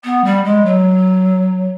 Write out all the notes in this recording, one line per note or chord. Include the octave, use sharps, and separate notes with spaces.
B3
G3
G#3
F#3